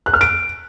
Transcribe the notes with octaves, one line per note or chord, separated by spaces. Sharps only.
F#6
F6
D7